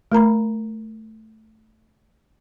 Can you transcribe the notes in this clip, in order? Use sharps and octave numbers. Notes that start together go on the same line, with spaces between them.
A3 A#4 A#5 B5